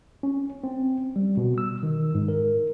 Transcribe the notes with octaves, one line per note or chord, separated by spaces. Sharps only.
C#4
C4
G3
B2
E6
D#3
G#2
A#4